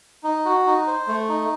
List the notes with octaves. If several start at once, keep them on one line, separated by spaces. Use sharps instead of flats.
D#4
F#4
D#4
C5
A3
D#4